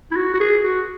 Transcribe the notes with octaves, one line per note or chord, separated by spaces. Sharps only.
E4
F#4
F#4
G#4
F#4